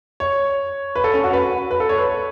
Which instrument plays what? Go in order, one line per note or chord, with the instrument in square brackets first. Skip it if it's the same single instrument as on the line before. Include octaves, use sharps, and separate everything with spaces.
[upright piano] C#5
B4
A4
C#4
F#4
B4
B4
A4
C#5
B4